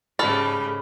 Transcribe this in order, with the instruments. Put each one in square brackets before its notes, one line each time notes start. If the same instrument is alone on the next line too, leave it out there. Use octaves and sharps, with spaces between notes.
[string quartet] G#2 C#3 G3 [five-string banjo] A4 [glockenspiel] B5 F6